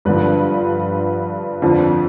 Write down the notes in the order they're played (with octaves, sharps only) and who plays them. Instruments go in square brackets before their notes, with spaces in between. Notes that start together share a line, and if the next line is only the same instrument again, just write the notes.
[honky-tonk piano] G2 D3 F3 B4
F2 D3 F3